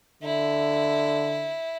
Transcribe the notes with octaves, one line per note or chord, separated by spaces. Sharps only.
D3 E4